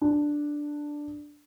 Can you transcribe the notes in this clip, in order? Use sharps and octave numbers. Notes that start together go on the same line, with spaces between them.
D4